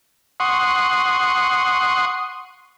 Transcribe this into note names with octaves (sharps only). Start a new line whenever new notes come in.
F#5 C6 C#6 D#6